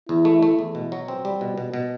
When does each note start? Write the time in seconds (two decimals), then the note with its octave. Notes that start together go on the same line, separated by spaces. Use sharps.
0.09 E2 E4
0.25 A3
0.43 A3
0.59 E2
0.75 B2
0.92 F#3
1.08 C4
1.25 G3
1.41 B2
1.58 B2
1.74 B2